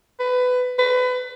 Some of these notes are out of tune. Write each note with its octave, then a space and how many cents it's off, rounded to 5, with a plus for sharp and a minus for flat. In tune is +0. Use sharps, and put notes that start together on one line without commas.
B4 +20
B4 +25